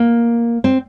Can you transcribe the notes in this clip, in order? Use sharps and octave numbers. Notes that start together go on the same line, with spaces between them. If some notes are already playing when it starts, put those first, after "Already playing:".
Already playing: A#3
C4